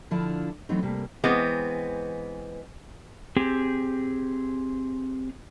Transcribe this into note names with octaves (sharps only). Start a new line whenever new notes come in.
D3 F3 D4 E4 F4
E3 F#3 A3 B3 C4 D#4
C3 G3 A3 A#3
E3 G#3 B3 C4
C4 G4 G#4